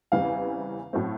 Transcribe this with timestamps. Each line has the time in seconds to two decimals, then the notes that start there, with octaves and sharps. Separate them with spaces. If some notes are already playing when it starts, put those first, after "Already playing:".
0.12 E2 C#3 E3 G3 C4 F5
0.93 A2 F#3 A3 C4